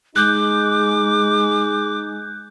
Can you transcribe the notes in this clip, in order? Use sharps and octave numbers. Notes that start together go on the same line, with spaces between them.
G#3 D#4 G#4 D6 F#6 G6